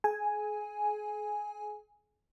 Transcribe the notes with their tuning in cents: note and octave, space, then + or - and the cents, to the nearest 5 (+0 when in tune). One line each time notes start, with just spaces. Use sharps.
G#4 +35 G#5 +0